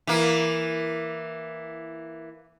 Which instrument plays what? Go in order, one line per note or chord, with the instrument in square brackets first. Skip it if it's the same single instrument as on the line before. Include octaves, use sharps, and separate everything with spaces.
[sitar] E3 A#3